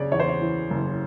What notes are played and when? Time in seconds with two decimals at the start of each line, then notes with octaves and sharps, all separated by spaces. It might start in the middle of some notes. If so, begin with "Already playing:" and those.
Already playing: F#1 C#3 C#5 D5
0.11 E2 C#5
0.20 C5
0.29 C#5
0.41 E3
0.70 F#1